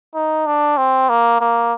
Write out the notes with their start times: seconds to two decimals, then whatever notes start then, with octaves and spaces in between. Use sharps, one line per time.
0.15 D#4
0.47 D4
0.77 C4
1.09 A#3
1.41 A#3